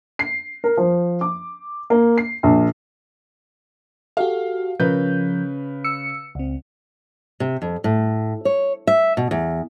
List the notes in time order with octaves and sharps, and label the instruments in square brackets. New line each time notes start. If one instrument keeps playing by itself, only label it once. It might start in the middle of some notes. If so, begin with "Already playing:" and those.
[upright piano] C7
A#4
F3
D6
A#3
C7
A#1
[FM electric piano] F#4 G4 A4 [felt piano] F5
[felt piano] C#3 B4 [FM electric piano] F3 A#4 G6
[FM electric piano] E6 C#7
C#2 C4
[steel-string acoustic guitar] C3
F2
A2
C#5
E5
B2
E2